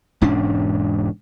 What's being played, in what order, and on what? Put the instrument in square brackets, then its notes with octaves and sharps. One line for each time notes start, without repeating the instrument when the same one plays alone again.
[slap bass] E1 G#2 C#4 D4